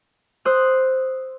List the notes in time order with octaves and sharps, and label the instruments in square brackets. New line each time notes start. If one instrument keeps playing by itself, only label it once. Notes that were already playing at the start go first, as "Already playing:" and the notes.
[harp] C5 D#6 E6 F#6